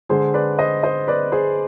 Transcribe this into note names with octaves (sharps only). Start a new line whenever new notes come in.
D3 G#3 G#4 C5
B4 D5
C5 D#5
C5 D#5
B4 D5
G#4 C5